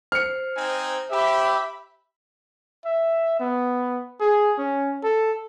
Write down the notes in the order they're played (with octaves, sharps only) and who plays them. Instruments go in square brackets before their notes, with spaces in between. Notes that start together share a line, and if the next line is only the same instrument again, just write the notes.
[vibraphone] C5 [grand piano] F6 C#7
[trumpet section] C4 D#4 G#5
[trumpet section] G4 [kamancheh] E5 B5
[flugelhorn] E5
B3
G#4
C#4
A4